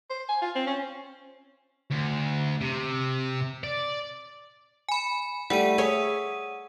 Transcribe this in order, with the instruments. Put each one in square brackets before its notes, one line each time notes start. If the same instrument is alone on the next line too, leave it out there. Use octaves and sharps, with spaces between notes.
[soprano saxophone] C5
G#5
F4
C4
C#4
[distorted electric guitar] D2
C3
D5
[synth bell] G#5 B5
[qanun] G3 A3 [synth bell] F#5 D#7
[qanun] G#4 C#5 E5